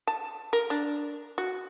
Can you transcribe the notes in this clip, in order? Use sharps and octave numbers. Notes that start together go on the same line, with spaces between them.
A5
A#4
D4
F#4